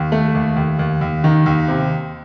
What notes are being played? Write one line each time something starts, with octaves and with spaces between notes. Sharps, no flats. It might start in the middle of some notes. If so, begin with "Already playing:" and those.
Already playing: D#2
A3
D#2
D#2
D#2
D#2
D#3
D#2
C3